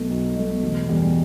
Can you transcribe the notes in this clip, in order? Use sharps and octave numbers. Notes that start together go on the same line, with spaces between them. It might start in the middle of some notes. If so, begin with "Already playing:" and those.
Already playing: B1 B2 A3
B1
B2 A3
E1
E2 B2 G3